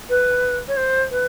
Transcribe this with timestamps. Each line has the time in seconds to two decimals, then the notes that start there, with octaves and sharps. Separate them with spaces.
0.10 B4
0.68 C#5
0.77 C5
1.11 B4